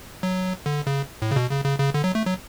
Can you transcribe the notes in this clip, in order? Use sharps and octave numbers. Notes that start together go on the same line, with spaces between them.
F#3
D3
C#3
A2
C#3
B2
C#3
C#3
C#3
D3
F#3
A3
F#3